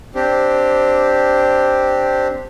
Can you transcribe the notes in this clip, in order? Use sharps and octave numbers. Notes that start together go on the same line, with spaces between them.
C4 D4 G4